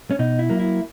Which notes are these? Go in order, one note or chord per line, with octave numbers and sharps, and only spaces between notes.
C#4
B2 D#4
E4
F#3 A#3
E4